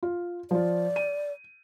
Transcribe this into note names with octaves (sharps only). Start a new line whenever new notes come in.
F4
F3 F4 D5
D#7